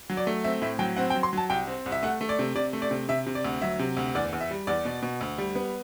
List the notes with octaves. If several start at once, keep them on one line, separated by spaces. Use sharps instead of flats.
F#3
D5
A3
C4 E5
A2 E5
F#3 G5
C4 F#5
G5
F#3
C6
F#3 A5
C2 G5
C4
C2
E5
A3 F#5
A3
D5
C3
C3 D5
A3
D5
C3
C3 E5
C3
D5
D2
F#3 E5
C3
D2
E2 D5
E2
E5
G3
E2 D5
B2
B2
D2
G3
B3